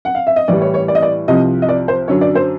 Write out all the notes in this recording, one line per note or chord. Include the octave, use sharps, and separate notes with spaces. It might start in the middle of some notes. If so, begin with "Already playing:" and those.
F#5
F5
E5
D#5
A2 E3 G3 D5
C#5
C#5
D5
D#5
D5
C2 C3 F3 D#5
D#5
D5
C5
F#2 D3 F#3 C#5
D5
C5